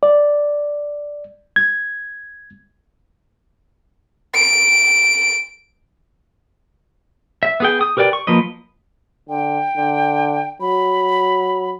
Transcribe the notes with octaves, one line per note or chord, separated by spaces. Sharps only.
D5
G#6
D7
E5
B3 G#4 G5
D#6
G4 A#4 B4 D5 G5
C#6
F3 A#3 B4 D#5
D3 G5
D3
F#3 B5